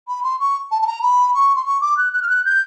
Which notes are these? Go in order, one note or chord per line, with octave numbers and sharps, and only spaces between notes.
B5
C6
C#6
A5
A5
A#5
B5
C#6
C6
C#6
D6
F#6
F#6
F6
F#6
G6